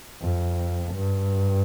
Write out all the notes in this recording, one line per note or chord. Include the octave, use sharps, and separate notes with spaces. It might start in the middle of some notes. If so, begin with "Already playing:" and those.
F2
G2